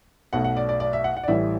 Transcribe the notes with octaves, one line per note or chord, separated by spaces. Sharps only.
B1 B2 F#3 A3 F#5
F#5
D5
D5
D5
E5
F#5
F#5
D5
A1 A2 E3 G3 E5